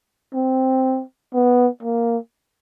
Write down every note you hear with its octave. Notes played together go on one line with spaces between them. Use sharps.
C4
B3
A#3